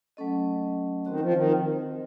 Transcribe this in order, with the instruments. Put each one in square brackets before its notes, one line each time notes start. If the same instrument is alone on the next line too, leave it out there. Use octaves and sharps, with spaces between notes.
[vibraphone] F#3 A3 C#4 A4 D#5
[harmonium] D#3 [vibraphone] C4 F#4 C5 D#5
[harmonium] F3
D#3